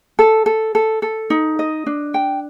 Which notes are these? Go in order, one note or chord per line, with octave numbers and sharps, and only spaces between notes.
A4
A4
A4
A4
D#4
D#5
D4
G5